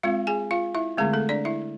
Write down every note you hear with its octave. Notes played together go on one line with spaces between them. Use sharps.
G#3 C4 F4 F5
G#4 G#5
F4 F5
E4 E5
D3 G#3 A3 C4 G#4
A3 A4
D4 D5
E4 E5